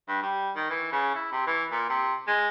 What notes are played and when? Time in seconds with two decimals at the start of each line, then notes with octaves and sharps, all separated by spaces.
0.08 G2
0.22 G3
0.55 D#3
0.70 E3
0.92 C#3
1.15 E4
1.32 C3
1.47 E3
1.72 A#2
1.89 C3
2.28 G#3